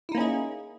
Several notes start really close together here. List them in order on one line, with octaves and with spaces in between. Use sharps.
E4 D#4 A#3 C#4 G#4